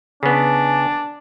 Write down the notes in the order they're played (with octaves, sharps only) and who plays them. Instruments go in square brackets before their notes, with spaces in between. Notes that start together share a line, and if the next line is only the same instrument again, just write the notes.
[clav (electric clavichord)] C#3 B3 [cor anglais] D4 [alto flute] G#5